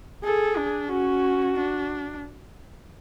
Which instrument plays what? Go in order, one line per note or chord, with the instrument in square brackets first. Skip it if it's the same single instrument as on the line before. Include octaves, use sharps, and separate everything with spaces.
[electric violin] G#4 [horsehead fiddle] A4
[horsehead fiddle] D4
[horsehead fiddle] C#4 [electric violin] F#4
[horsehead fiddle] D4